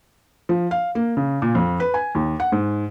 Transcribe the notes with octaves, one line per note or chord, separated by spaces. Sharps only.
F3
F5
A#3
C#3
A#2
F2
B4
G#5
D#2
F#5
G#2